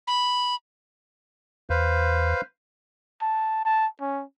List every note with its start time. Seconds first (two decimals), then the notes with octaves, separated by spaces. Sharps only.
0.07 B5
1.70 E2 B4 C5 F5
3.22 A5
3.65 A5
4.01 C#4